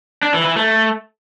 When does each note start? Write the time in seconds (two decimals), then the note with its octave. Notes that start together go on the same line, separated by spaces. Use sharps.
0.23 D4
0.34 E3
0.45 E3
0.56 A3